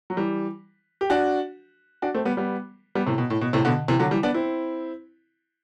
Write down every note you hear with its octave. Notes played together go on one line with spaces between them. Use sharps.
F#3
E3 G3
G4
D4 F#4
D4 F#4
A3 C4
G3 B3
G3 B3
G3 B3
A2 C3
B2
A2
B2
A2 C3
B2 D3
C3 E3
D3 F#3
E3 G3
B3 D4
C4 E4